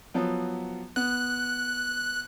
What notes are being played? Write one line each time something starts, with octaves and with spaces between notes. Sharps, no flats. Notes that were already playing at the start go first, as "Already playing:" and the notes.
F3 F#3 B3
B3 F#6